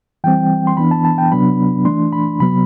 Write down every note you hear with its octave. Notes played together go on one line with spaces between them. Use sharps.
E3 G3 C4 G5
C6
E3 B3 D4 B5
A5
A5
G5
C3 F#3 B3 D4 B5
E3 A3 D4 C6
B5
C3 F#3 B3 B5